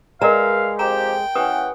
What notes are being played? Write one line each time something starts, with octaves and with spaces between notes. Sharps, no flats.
G#3 A#4 B4 D5 E5 F5 A#5
F2 G4 G5 A#5
E3 C#4 G4 B4 F#5 D#6